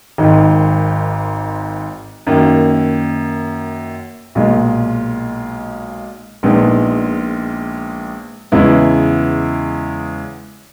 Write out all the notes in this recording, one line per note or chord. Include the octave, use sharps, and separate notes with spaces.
G#1 G#2 D#3
F#2 D#3 A#3
B1 A#2 G#3
A#1 A#2 G#3 B3 D#4
E2 C#3 G#3 B3 E4